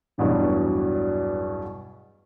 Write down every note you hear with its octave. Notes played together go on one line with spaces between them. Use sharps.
A1 E2 G2 B2 F#3